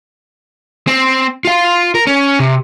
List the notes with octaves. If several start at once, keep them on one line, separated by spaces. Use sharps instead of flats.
C4
F4 F5
A#4
C#4
C3